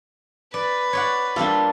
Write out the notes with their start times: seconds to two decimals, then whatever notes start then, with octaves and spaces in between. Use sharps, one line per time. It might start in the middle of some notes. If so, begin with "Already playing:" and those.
0.54 B4 D5
0.93 C#5 D5 F#5
1.36 G3 A#3 D4 F4 A4